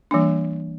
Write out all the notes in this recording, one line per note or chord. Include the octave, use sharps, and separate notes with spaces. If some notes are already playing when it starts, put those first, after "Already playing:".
E3 G3 A#3 D4